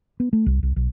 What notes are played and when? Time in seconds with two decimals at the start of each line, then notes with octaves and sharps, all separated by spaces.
0.20 B3
0.33 A3
0.46 C2
0.63 C2
0.76 B1